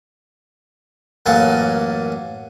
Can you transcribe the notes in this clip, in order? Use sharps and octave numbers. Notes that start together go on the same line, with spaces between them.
A1 F#2 A#3 G#5 A5